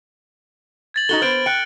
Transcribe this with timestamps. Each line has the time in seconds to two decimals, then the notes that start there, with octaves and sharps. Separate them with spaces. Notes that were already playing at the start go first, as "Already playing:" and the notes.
0.94 G#6 A6 F#7
1.09 D#4 F#4 A4 G7
1.22 B3 B4 C5 F6 D7 G7
1.46 G5 F#6 C#7 D7